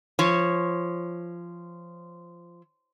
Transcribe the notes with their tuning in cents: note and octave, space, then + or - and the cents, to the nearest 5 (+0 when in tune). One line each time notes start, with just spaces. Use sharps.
F3 -15 C#5 -10